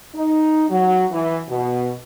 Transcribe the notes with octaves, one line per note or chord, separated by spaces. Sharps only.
D#4
F#3
E3
B2